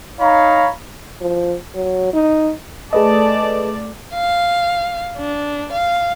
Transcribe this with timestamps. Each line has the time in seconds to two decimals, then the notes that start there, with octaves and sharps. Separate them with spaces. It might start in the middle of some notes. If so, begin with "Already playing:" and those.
0.20 D#4 C#5 F5 A#5 B5
1.21 F3
1.75 F#3
2.13 D#4
2.93 A3 G#4 B4 D5 D#5 A5
4.13 F5
5.18 D4
5.72 F5